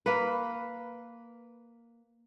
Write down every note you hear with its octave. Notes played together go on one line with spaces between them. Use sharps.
A#3 B4